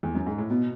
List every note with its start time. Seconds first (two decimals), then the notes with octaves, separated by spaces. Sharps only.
0.03 E2
0.15 F#2
0.26 G#2
0.38 A2
0.50 B2 B3